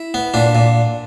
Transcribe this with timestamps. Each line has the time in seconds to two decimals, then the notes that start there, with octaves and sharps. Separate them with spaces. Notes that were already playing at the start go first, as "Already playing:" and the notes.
Already playing: E4
0.14 B3
0.34 A#2 D4
0.55 A#2